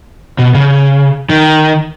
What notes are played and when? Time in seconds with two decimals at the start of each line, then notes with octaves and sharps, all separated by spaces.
0.39 B2
0.54 C#3
1.29 D#3